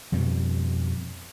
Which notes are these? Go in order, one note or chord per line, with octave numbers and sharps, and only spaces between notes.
F2 B2 G3